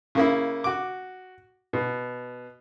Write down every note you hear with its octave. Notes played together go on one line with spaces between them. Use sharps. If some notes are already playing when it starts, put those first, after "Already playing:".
C#3 A#3 E4
F#4 D6
B2